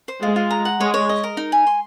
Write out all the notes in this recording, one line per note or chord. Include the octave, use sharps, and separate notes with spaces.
C5
G#3 F4
F4
A#5
F#5
G#3 C#5
C#5
D#5
A#4
D#4
G#5
C6